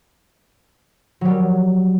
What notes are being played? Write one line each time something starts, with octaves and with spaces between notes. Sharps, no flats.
F#3 G3